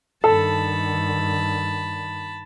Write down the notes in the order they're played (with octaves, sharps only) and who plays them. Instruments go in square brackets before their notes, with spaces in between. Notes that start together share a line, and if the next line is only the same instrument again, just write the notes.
[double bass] G2 D#3 [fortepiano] A4 [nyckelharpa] A5 B5